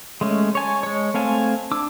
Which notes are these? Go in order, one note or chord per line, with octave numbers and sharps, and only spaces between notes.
G#3 A3 C#4
C#5 G#5 A5
G#3 C#5
A3 C4 F5 G#5 A5
D4 D6 E6